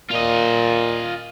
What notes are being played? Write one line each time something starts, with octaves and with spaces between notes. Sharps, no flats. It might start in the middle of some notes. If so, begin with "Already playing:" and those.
A#2 F4 D#5